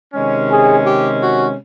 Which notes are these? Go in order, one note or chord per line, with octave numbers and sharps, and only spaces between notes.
C3 D#3 G#3 C#4
G#4
G4
F#4